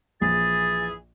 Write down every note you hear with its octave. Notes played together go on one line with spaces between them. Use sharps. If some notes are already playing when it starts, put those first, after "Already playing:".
A#1 E3 G#4 A6